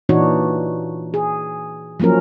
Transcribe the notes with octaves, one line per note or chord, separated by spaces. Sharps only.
A#2 E3 D4 D#4 F#4 C#5
G#4
F3 F#3 A#3 C#4 A#4